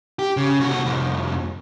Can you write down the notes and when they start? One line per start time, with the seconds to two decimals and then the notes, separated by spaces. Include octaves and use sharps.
0.19 G4
0.37 C#3
0.60 C2 F#4
0.85 C2 F2